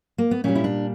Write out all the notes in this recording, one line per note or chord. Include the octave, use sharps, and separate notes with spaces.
A#3
B3
A#2 G3 C#4
E4
D4